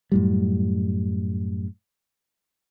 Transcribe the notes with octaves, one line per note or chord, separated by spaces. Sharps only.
F#2 A2 G3